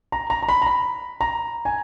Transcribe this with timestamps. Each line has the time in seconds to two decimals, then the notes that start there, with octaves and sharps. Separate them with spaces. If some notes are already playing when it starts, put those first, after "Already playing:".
0.12 A#5
0.30 A#5
0.42 A#5
0.49 B5
0.62 A#5
0.66 B5
1.21 A#5
1.65 G#5